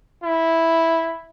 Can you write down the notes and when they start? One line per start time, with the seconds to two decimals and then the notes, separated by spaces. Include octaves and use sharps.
0.24 E4